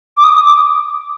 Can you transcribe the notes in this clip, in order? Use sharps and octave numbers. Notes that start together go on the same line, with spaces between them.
D6
D#6
D#6
D6